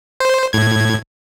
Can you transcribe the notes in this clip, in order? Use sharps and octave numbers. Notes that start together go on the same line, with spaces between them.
C5
A2 G#6